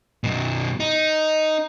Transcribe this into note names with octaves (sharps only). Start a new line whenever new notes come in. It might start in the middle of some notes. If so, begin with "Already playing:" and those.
F#2 B2
D#4